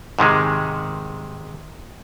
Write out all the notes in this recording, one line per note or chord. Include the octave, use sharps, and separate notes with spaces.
G#2 C3 D#3 G#3